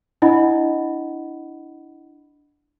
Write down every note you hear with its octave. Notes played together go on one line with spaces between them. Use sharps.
D4 E4 D#5 F#5 B5